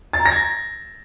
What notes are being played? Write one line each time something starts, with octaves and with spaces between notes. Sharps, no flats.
A6
A#5
A#6
G#6